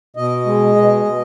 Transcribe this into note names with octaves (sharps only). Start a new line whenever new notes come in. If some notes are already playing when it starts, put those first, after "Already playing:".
B2 D#5
G#3
B2
B2